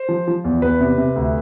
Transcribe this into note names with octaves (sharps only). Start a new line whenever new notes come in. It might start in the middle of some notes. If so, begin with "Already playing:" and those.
Already playing: C5
F3
F3
E2
E2 B4
C3
C3
D2